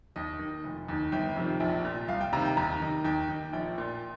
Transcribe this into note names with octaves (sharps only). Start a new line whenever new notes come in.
D#2 D#5
D#3
F1
D#2 D#3
G1 G5
F2 C3 D#3
A#1
A#2
C2 F5
G5
C3 D#3 A#5
G5
D#2 A#5
D#3
D#2 G5
D#3
A#1 G5
A#2